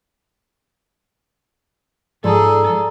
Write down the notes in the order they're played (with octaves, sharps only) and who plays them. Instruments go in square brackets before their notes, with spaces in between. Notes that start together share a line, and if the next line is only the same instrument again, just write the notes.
[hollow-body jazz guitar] G#2 F3 C6 [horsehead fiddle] G#4 [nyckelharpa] A4 [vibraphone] D5 A#5